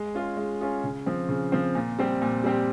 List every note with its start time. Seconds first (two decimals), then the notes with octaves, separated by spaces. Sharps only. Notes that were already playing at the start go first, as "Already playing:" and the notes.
Already playing: G#3
0.14 C#4 F4 G#4
0.37 G#3
0.61 C#4 F4 G#4
0.84 C#3
1.06 F3 C4
1.29 C#3
1.52 F3 C4
1.75 A#2
1.99 G3 C4 G4
2.22 A#2
2.44 G3 C4 G4